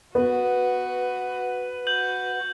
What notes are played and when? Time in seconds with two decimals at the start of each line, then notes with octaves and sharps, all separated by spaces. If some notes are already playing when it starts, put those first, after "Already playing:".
0.15 B3 F#4 B4
1.87 F#4 G6 F#7